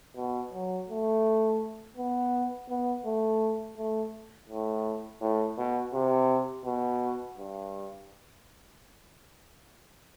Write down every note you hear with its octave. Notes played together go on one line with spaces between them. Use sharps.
B2
F#3
A3
B3
B3
A3
A3
A2
A2
B2
C3
B2
G2